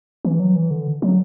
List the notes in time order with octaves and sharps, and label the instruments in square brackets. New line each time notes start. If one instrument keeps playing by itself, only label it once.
[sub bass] E3
F#3
E3
D3
F#3